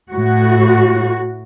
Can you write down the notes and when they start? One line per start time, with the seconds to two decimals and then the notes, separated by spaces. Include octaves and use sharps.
0.12 A2 F#4